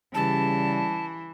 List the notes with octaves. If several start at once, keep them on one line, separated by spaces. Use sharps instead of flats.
C#3 E3 G3 A5